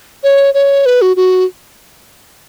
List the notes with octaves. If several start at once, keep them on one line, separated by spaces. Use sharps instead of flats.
C#5
C#5
B4
F#4
F#4